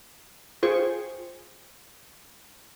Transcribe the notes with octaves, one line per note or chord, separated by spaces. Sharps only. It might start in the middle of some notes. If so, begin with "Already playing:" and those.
F4 G#4 C5 G5 C#6